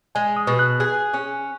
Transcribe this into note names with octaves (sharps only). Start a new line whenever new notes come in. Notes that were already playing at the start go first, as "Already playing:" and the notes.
G#3 G#5
D#6
B2
F#6
G#4 F#6
C#4